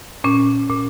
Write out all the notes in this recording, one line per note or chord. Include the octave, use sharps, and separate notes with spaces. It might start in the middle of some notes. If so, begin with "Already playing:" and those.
A#2 C#4
A#2